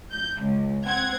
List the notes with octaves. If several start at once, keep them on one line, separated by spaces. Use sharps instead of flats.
G6
C#2
C4 F#5 G#6